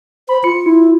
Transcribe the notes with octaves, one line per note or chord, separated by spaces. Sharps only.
C5 B5
F4 C#7
E4